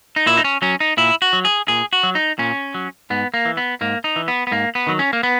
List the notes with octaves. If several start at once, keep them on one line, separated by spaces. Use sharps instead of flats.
D#4
A#2 E4
D#4
C#4
F#3 C#4
D#4
A#2 E4
F#4
F#3
G#4
A#2 G#4
F#4
F#3
D#4
A#2 C#4
F#3
G#2 B3
A#3
E3
B3
G#2 A#3
D#4
E3
B3
B3
G#2 A#3
B3
D#3 F#3
C#4
A#3
B3